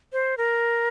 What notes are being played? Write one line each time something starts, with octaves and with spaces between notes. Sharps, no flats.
C5
A#4